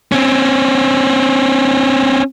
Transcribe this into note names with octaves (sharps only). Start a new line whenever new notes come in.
C4 C#4